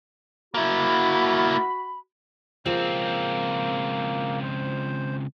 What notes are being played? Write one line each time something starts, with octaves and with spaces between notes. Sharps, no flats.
A#3 E4 F#4 B5
C#2 F3 A#3 C4 G#4
C5